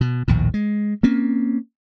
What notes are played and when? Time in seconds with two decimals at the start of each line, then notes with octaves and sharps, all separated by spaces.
0.01 B2
0.28 A#1 D#2 A2
0.54 G#3
1.03 A#3 C4 C#4